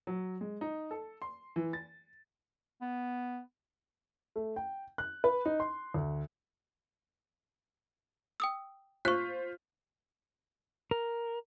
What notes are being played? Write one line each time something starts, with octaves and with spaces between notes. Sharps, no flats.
F#3
G#3
D#4
A4
C6
E3
A6
B3
A3
G5
F#6
B4
D#4
C6
D2
G5 D#6 E6
F4 C5 C#6 F#6 B6
A#4